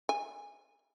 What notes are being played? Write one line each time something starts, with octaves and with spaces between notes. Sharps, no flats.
G#5